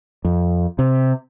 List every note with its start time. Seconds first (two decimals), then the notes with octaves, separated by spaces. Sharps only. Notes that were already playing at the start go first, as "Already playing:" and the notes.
0.25 F2
0.79 C3